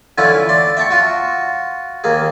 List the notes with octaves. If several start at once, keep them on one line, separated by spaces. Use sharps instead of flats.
D3 E3 C#4 E4 F4 B4
D5 C6
E5 G5 A5 C#6
F4 F#4
D#2 A#3 G#4